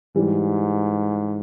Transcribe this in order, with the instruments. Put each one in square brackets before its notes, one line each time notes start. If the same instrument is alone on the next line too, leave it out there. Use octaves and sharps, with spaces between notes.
[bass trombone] G#2 [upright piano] E3 G3